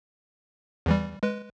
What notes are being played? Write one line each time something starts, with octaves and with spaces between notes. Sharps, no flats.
E2 E3 G3
G#3 B4